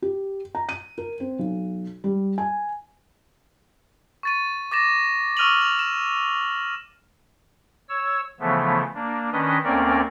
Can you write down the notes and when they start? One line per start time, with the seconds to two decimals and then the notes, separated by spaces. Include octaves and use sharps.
0.02 G4
0.55 A#5
0.69 D#7
0.98 A#4
1.20 C4
1.39 B1
2.04 G3
2.38 G#5
4.23 C#6 A6 D#7
4.72 D6 A6 A#6 E7
5.37 C#6 E6 F6 D#7 F7 F#7
5.62 F7
5.79 E7
7.89 C#5 E6
8.40 C#3 E3 F3 A3 B3
8.95 A#3 D4
9.32 D#3 C#4 D4 B4 D#5
9.64 D2 A#3 C4 C#4 A#4 D5